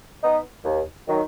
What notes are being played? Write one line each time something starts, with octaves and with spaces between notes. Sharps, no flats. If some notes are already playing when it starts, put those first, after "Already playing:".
B3 D#4
D#2
D#3 F#3